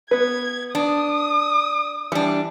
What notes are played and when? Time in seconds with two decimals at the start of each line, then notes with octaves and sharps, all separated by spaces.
0.11 B3 B4 G#6
0.75 D4 D#6
2.12 E3 G3 D4